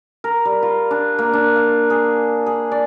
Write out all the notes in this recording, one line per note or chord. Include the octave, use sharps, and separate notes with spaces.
A#4
G3
F4
D4
A#3
D4
F5
G#4
G#4
D5